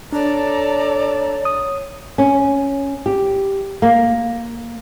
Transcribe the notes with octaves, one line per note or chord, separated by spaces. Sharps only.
D4 A4 C#5 D5 A5 A#5
D#6
C#4
G4
A#3